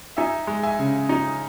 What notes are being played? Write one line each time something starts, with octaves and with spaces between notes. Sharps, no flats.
D#4 E5 G#5
G#3
E5 G#5
C#3
D#4